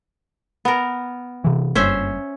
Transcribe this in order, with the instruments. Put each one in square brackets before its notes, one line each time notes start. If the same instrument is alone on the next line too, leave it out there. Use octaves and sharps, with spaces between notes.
[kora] B3 A#4
[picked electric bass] C3 E3
[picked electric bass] F#1 G2 [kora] C#4 C5 E5